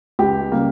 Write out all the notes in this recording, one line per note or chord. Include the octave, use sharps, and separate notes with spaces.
C#2 G4
C#3 G3 A#3